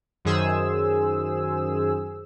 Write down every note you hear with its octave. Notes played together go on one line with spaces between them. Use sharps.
F#2 D#3 G#4 C5 E6